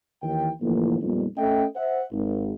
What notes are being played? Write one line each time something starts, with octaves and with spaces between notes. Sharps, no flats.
D#2 D#3 E3 G5
G1 A2 E3 F3 A#3
F2 A#2 G3 B3 D#4
A3 C#4 A4 D#5 E5 G5
C5 E5 F#5
G#1